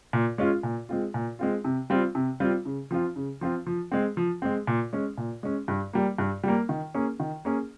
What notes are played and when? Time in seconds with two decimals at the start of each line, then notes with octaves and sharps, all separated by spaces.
0.13 A#2
0.38 G#3 C#4 F4
0.63 A#2
0.89 G#3 C4 F4
1.14 A#2
1.39 G#3 C4 F4
1.64 C3
1.90 G3 C4 F4
2.15 C3
2.40 G3 C4 F4
2.65 C#3
2.91 F3 C4 F4
3.16 C#3
3.41 F3 C4 F4
3.66 F3
3.92 G#3 C4
4.17 F3
4.42 G#3 C4
4.67 A#2
4.93 G#3 C#4
5.18 A#2
5.43 G#3 C#4
5.68 G2
5.93 G3 A#3
6.18 G2
6.43 G3 A#3
6.69 D#3
6.94 A#3 C#4 G#4
7.20 D#3
7.45 A#3 C#4 G#4